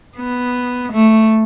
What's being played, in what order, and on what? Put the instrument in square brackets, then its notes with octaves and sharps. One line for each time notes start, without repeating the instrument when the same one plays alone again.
[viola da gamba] B3
A3